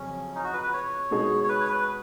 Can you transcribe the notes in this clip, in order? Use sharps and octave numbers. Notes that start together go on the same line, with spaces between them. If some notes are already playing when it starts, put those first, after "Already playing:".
Already playing: F2 C#3 F#3 C#4
D#4
F#4
B4
B4
C#5
B2 G#3 D#4 G#4
C#5
B4
C#5
B4